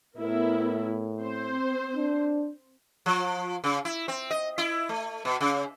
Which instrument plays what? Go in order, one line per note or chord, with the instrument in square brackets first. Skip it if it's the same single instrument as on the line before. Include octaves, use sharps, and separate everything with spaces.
[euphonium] A2 [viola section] B3 E4 A#4
[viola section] C4 C5
[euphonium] D4
[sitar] F3
C#3
E4
C4
D#5
E4
A3
B2
C#3